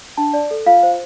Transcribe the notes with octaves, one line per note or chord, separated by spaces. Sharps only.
D4 A5
D5
A4
F4 F5
C5